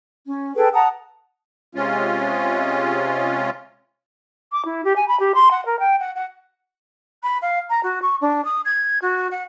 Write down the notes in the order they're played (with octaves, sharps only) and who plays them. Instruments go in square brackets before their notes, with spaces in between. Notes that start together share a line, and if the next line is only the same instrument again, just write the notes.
[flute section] C#4
G#4 A4 B4 G5
F#5 A5 A#5 D#6
[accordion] C3 G#3 C#4 F4
[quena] D6
E4
G4
G#5
B5
G4
C6
F#5
A#4
G5
F#5
F#5
[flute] B5
F5
A#5
F#4
C#6
D4
D#6
G#6
F#4
F#5